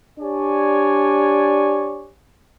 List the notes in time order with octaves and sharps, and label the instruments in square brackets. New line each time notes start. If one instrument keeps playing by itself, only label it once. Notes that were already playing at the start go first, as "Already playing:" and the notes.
[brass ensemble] D4 G4 C#5 D5 G#5